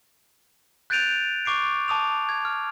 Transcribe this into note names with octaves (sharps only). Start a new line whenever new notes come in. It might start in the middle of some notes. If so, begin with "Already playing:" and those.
F#6 G6 A6 D7 D#7 F7
C#6 D6 C7 D7
A5 D6 D#6 F7
G#6
F6